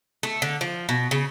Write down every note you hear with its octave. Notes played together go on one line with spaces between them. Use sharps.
A3
D3
F3
B2
C#3